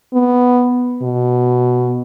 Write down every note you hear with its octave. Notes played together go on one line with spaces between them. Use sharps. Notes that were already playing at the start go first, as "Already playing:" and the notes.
B3
B2